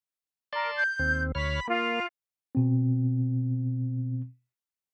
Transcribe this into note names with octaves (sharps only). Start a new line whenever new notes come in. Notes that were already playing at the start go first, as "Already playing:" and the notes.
A#4 D5 A5 C6
G6
D#2 C4
D2 C#5 B5 F6
A#3 F4
B2 C4